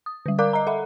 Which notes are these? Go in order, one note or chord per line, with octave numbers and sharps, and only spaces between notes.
D#6
D3 G3
A#4 D5 F5 A#5 D6 F#6
D#5 A#5
A4 E5 F#5 B5